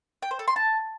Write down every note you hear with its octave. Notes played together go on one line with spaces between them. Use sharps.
G5
C5
A4
C6
A5